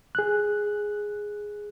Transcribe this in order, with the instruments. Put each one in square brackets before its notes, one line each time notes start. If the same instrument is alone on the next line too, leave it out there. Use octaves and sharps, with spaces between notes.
[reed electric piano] G#4 F#6